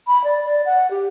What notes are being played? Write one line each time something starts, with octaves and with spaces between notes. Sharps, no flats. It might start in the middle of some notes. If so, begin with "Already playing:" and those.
B5
D5
D5
F#5
G4